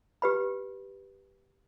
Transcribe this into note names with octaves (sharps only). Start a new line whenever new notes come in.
G4 B4 B5